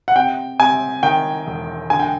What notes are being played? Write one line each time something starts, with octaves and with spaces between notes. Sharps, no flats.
F#5
C3 G5
C3 G#5
D#3 G5
E1
D3 G#5
G5